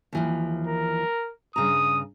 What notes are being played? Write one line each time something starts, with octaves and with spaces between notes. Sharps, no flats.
D#2 E3 F3
A#4
G2 C#3 A#5 D#6